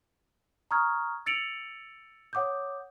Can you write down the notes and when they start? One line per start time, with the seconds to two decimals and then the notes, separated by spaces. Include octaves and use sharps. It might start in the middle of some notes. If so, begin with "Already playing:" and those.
0.71 A#5 C#6 D#6 F6 G#6
1.26 E6 A6 C#7 D7 F7 F#7
2.33 C#5 F#5 D6 D#6 G6